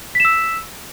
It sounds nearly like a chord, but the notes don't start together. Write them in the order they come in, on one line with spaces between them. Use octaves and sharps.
B6 E7 E6